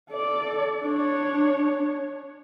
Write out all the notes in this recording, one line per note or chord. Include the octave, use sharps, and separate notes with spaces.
A4 D5
D4 C#5